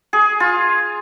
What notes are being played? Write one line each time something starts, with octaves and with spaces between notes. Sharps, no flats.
G#4
F4